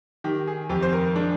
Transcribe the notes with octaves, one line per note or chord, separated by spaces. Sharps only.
D#3 G4
G#4
F2 G4
C5
A#4
G#3 D4